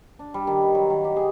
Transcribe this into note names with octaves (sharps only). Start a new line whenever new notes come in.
D4
G3
D#3
B4
F#3
D#3
G4
G#4